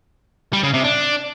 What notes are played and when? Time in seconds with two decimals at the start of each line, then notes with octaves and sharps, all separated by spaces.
0.53 G3
0.63 C#3
0.73 C3
0.84 D4